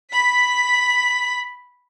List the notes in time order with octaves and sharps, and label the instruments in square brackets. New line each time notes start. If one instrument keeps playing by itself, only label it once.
[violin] B5 B6